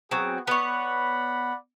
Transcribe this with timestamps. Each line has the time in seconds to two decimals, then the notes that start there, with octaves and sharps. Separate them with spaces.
0.11 F#3 B3 C4 F#4 G#4
0.47 B3 C#5 D5 F#5 B5